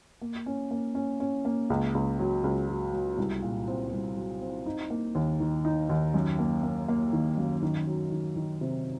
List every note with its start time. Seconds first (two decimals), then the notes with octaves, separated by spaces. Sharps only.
0.22 A#3
0.46 C#4
0.71 A#3
0.95 C#4
1.20 C#4
1.45 A#3
1.70 C#2
1.94 C#2
2.19 F#3
2.44 C#2
2.68 F#3
2.93 F#3
3.18 C2
3.42 A#2
3.68 C4
3.92 C2
4.17 F#3
4.41 C4
4.66 D#4
4.90 A#3
5.15 D#2
5.40 D#3
5.65 D#4
5.89 D#2
6.14 F#2
6.39 A#3
6.63 A#3
6.88 A#3
7.13 D#3
7.37 F#2
7.63 D#3
7.87 F#3
8.12 D#3
8.36 D#3
8.61 C3